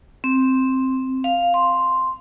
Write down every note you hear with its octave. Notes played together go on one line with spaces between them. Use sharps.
C4
F5
C6